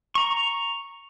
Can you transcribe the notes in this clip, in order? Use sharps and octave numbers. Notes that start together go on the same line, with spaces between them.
A#5 C#6